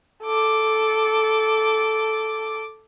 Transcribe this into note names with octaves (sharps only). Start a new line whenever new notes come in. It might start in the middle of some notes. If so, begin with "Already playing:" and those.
A4 D6